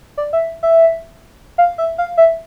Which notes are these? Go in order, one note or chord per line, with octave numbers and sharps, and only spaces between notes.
D5
E5
E5
F5
E5
F5
E5